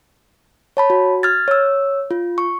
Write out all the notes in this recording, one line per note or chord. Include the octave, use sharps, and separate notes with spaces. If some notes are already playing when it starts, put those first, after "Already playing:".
C#5 A5 B5
F#4
F6 G#6 A6
C#5 E6
F4
C#6